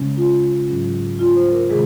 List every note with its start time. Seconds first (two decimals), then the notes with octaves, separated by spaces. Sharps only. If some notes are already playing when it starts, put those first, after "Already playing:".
Already playing: C#3 G#3 C#4
0.17 F4
0.68 G#2 F#3 C#4
1.19 F4
1.36 C5
1.52 A#4
1.69 C3 D#3 G#3 G#4